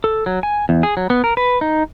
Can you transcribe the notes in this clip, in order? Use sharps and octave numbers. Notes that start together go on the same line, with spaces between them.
A4
F#3
G#5
E2
G#4
F#3
B3
A#4
B4
D#4